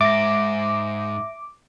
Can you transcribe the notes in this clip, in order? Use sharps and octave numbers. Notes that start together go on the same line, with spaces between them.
G#2 E5 D6 A#6